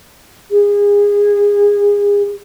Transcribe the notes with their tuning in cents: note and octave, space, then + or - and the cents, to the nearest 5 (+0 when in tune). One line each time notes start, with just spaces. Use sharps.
G#4 -25